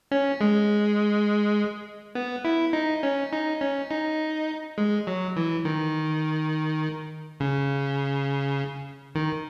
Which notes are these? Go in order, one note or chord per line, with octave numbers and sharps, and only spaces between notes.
C#4
G#3
B3
E4
D#4
C#4
D#4
C#4
D#4
G#3
F#3
E3
D#3
C#3
D#3